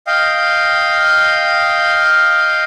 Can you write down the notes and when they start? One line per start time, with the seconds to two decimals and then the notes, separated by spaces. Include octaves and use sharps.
0.07 D#5 F5 G5